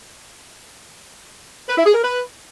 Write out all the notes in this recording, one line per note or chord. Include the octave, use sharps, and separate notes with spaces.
B4
E4
G#4
A#4
B4